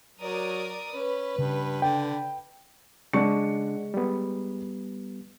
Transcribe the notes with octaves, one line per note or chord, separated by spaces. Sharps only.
F#3 A#4 D5 D#6
C#4 B4
G2 C#3
D3 G5
C#3 G#3 D4 F#5 C#6 C#7
G3 B3